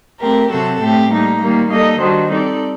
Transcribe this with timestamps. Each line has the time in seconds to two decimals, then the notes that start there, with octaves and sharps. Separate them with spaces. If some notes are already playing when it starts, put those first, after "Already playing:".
0.20 A3 C4 G4 A#4
0.50 C3 F#3 C4 F#4 A4
0.80 A2 A3 C4 G4
1.10 G3 A#3 D#4
1.40 D#3 G3 A#3
1.70 G3 A#3 D#4 A4 D#5
2.00 D#3 G3 D4 F#4 C5
2.30 G3 C4 D#4 A4 D5